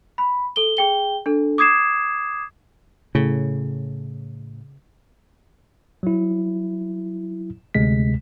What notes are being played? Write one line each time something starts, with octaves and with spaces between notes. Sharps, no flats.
B5
A4 G7
G#4 G5 G7
D4 A4
D6 D#6 G#6 C7 E7
A2 C#3
F#3 E4
D2 C3 G#3 B6